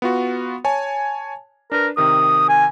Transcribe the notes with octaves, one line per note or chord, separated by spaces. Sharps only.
B3 F4 F#4
C#5 G#5 A5
D4 A#4 B4
C3 D#3 A#4 D#6
G#5